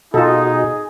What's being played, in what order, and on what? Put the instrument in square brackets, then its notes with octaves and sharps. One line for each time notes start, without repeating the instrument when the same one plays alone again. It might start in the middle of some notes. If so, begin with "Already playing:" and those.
[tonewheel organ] B2 F#4 D#5 [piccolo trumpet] D#4 [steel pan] F4 A4 [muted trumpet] G#4